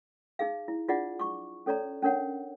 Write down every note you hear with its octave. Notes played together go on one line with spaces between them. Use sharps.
D#4 G#4 F5
E4
D4 F4 G#4 D5 D#5 F#5
C#6 D6
C#4 A4 C#5 D5 A#5
C#4 D4 A#4 C#5 F#5